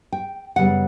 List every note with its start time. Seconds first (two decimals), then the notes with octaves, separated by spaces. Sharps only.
0.12 G5
0.56 F#2 C#3 G3 B3 F#5